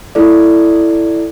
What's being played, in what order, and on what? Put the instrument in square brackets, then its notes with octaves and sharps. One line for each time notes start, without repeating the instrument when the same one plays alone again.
[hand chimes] E4 A4 D5